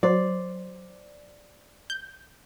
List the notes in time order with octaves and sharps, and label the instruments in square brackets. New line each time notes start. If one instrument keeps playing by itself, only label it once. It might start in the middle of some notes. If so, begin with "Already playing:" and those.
[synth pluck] F#3 [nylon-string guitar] C5 D5
[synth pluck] G6